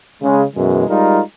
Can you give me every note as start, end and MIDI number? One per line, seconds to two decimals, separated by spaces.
0.22 0.43 49
0.22 0.43 56
0.56 0.85 42
0.56 0.85 47
0.56 0.85 52
0.56 0.85 56
0.88 1.20 55
0.88 1.20 56
0.88 1.20 63
0.88 1.20 65
0.88 1.20 70